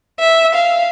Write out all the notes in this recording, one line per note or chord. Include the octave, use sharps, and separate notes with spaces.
E5
F5